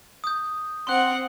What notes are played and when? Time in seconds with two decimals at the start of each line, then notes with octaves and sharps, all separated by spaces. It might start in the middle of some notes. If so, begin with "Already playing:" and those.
0.24 D#6 G6
0.87 C4 F#5 C6 F#6 F#7